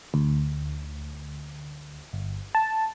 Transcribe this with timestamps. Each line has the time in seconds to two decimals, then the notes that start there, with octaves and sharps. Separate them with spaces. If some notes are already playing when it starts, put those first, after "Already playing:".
0.14 D2
2.13 G1
2.55 A5